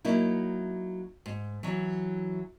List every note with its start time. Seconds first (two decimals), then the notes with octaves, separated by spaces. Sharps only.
0.05 F#3 A#3 D#4 E4
1.26 G#2
1.63 E3 F#3